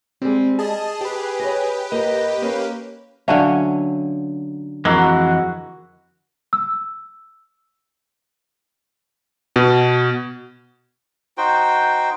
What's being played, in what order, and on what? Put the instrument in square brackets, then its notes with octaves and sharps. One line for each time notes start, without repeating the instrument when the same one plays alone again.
[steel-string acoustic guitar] G3 G#3 [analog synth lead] C4
[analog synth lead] G#4 [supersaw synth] D#5 A5
[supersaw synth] G4 B4 [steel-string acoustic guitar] C5
[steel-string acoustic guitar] C#5 D#5
[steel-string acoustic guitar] G2 A#3 [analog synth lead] D#5
[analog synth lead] A#3 [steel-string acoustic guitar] C#4
[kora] D3 F#3 C#4 [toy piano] E5 F5 A5
[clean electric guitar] F2 E3 G#3 [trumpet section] F#4 [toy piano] A#4 A#5
[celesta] E6
[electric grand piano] B2
[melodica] D#4 F#4 C5 G5